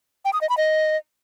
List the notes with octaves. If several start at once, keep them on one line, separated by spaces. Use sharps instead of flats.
G5
D#6
D#5
B5
D#5